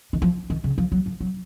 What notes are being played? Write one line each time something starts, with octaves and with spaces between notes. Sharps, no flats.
D#3
F3
D#3
C#3
F3
F#3
F3
F#3